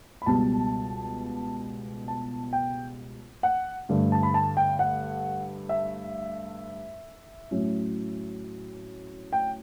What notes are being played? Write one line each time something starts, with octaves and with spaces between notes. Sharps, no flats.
B5
C#2 B2 G3 B3 A5
A5
G5
F#5
G2 D3 A3
A5
B5
A5
G5
F#5
E5
A2 F#3 C#4
G5